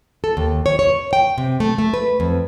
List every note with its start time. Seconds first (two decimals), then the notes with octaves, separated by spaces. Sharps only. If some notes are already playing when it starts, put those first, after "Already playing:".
0.24 A4
0.37 D#2
0.66 C#5
0.79 C#5
1.13 G5
1.38 C3
1.60 A3
1.78 A3
1.94 B4
2.20 F2